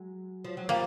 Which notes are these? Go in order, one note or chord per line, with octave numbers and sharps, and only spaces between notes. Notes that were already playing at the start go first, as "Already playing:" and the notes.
Already playing: F#3 G#3
F3
F#3
F3 G3 A#3